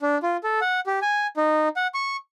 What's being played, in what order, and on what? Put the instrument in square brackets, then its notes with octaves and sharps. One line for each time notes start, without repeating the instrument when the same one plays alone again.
[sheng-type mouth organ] D4
F4
A4
F#5
G4
G#5
D#4
F#5
C#6